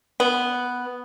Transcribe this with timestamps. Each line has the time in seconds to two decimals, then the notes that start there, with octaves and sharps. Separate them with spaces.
0.20 B3